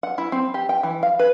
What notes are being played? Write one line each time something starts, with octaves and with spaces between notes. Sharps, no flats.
F#5
E4
C4
G4
G5
E3
F5
B4